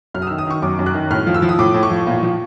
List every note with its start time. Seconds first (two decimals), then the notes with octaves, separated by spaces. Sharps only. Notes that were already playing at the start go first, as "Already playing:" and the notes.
0.14 F#2 F6
0.22 D#6
0.27 D#3 E6
0.38 D#6
0.47 D#3 C#6
0.62 F#2 D6
0.79 F#2
0.86 F#6
0.94 D#3
1.11 A2 F6
1.27 F3
1.34 E6
1.42 F3
1.49 D#6
1.59 A2 D6
1.74 A2
1.83 C#6
1.90 F3
2.07 A#2
2.23 F3